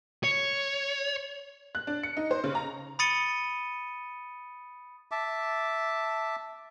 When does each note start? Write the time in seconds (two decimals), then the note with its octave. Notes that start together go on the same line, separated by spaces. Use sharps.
0.24 C#5
1.75 F#6
1.87 D4
2.03 C#7
2.17 D#4
2.31 C5
2.44 C#3
2.55 A#5
2.99 B5 D#6 A6 C#7 D#7 G7
5.11 E5 A5 D6